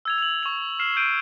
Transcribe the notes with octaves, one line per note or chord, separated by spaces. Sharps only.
E6 G#6 F7
F7 F#7
C#6 F7
F6 C7 E7
G6 D7 D#7